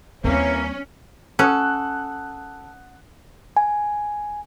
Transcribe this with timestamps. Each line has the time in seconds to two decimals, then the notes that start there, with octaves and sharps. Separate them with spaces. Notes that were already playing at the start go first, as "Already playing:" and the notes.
0.24 D#2 E3 G3 A#3 C4 C#4
1.39 C#4 A4 F#5 D#6 F#6
3.57 G#5